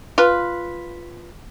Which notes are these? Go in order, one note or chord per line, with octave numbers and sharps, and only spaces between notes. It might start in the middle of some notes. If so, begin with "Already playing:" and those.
F4 B4